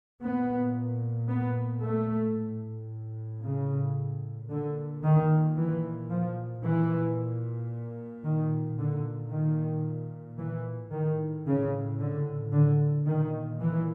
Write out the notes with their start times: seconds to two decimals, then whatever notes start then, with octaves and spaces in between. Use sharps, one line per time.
0.22 A#2 B3
1.28 B3
1.83 A3
2.37 A2
3.43 C#3
4.50 A#2 D3
5.04 D#3
5.56 E3
6.10 F3
6.64 A#2 E3
8.24 D#3
8.78 A#2 D3
9.32 D#3
10.38 E3
10.91 A2 D#3
11.46 C#3
11.99 D3
12.52 D3
13.05 A#2 D#3
13.60 E3